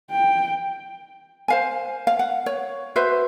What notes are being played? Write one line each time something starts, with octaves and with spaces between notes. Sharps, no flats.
G5
C5 F5 G#5
F5
F#5
C#5
F#4 B4 C5 E5